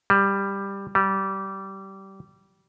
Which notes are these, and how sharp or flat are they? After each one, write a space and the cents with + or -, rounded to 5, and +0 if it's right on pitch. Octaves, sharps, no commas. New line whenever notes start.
G3 +10
G3 -20